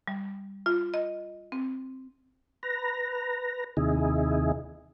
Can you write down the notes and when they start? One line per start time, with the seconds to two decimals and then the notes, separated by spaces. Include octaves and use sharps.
0.08 G3
0.66 F4
0.94 D#5
1.52 C4
2.63 B4 A#5
3.77 D#2 C3 D#4 E4 G#4